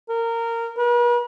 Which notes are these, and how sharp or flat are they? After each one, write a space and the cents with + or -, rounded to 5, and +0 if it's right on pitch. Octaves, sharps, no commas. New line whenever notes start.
A#4 -15
B4 -45